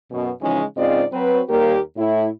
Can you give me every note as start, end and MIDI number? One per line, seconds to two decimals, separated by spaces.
0.10 0.30 42
0.10 0.30 47
0.41 0.63 49
0.41 0.63 52
0.41 0.63 53
0.41 0.63 56
0.41 0.63 61
0.41 0.63 63
0.76 1.03 44
0.76 1.03 49
0.76 1.03 60
0.76 1.03 65
0.76 1.03 74
0.76 1.03 75
1.12 1.41 54
1.12 1.41 60
1.12 1.41 71
1.48 1.78 39
1.48 1.78 55
1.48 1.78 58
1.48 1.78 67
1.48 1.78 70
1.97 2.28 45
1.97 2.28 64